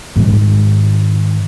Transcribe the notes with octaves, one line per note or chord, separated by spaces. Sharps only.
G#2 D#3